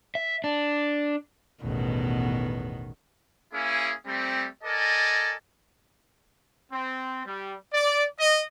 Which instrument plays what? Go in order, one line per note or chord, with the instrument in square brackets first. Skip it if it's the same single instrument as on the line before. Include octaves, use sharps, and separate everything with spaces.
[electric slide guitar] E5
D4
[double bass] A1 E2 [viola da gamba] B2 D#3 B3
[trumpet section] A#3 C#4 E4 G#4
G3 A3 C4
A4 A#4 D5 D#5 G#5
C4
G3
D5
D#5